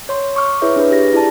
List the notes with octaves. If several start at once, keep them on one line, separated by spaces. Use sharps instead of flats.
C#5 C6
C#6 D6 F6
E4 G#4 B4 C#5 E5
D4 G#4 B4
G4 A#6
E4 G#4 D5 A5